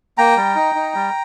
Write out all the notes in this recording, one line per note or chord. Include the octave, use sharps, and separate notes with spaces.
A#3 G5 A#5
G3
D#4
D#4
G3